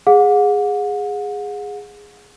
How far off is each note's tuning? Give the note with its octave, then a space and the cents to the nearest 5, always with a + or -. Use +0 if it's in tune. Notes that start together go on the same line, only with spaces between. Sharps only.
G#4 -10 F#5 -40